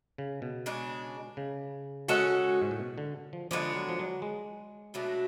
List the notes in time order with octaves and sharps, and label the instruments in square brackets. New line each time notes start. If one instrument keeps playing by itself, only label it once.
[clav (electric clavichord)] C#3
B2
[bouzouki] C#3 G#3 D4
[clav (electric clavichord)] C#3
[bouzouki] G#3 C#4 F#4 A4
[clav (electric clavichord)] G#2
A2
B2
D3
F3
[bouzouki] D3 G#3 B3 D4 [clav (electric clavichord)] F3
[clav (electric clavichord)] F#3
F3
F#3
G#3
[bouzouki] B2 F#3 A3 D4